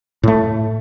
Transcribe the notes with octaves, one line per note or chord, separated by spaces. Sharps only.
A2 A3